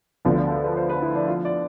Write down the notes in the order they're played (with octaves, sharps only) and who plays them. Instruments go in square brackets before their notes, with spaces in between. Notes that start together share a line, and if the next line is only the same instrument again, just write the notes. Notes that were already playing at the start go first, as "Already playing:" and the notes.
[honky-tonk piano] D2 D3 F3 B3 [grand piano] D4
[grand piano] D4
A4
B4
C5
B4
E4
D4
F4
D5